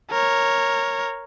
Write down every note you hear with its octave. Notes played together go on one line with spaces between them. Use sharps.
A#4 C#5